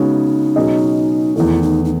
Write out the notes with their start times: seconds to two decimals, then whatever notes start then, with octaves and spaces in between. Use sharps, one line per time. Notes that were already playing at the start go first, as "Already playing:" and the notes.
Already playing: C#3 G#3 B3 D#4 F#4 C#5
0.56 B2 F#3 C#4 G#4 D#5
1.36 E2 D#3 A3 E4
1.62 D#4
1.85 D#4